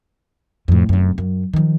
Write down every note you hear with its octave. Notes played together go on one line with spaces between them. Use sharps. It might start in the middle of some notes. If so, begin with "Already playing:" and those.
F2 A2
F1 F#2
F#2
D#3 F3